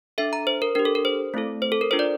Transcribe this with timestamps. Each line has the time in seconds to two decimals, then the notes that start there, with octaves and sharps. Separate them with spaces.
0.18 D4 A4 E5
0.33 A#5
0.47 C5
0.62 A#4
0.75 D4 G4 A#4
0.85 A4
0.95 A#4
1.05 C5
1.34 A3 C4 E4 A4
1.62 C5
1.72 A4
1.81 A#4
1.91 D4 F4 A4 C5
1.99 D5